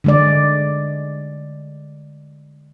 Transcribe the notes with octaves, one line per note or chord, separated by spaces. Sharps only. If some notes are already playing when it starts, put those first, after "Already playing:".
D3 G#3 D5